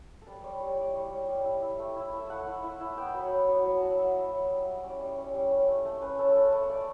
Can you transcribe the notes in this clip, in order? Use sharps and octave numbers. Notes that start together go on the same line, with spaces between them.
A4
G3 B4
G3 C#5
G3 C#5
E4 D5
G3 C#5
G3
G3
E4
E4 E5
A3
E4
A3
E5
A3 F#5
E4
E4
E4
B3 G5
B5
F#3
B5
B3
F#3
F#3 B5
A5
F#3
F#5
F#3 E5
F#3
E4
G3
G3 E5
C#4 D5
G3 C#5
C#4
G3
C#4
A3
A3
C#4 B4
C#4 A4
A4
A3 B4
A3 C#5
A3 D5